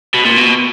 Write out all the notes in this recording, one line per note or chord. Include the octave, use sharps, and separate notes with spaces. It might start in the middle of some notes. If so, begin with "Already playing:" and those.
B2
A#2
B2